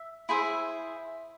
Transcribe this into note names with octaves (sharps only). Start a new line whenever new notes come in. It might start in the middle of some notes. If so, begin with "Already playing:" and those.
Already playing: E5
E4 G#4 C5 E5